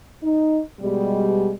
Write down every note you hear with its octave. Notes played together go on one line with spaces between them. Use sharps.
D#4
B2 G3 G#3